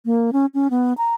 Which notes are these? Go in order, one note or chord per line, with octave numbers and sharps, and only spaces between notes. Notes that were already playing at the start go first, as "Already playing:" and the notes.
A#3
C#4
C#4
B3
A#5